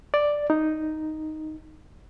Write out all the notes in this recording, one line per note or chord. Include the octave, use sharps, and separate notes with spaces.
D5
D#4